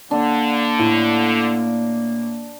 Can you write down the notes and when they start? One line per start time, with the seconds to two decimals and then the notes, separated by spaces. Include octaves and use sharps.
0.11 D3 A#3 D4
0.79 A2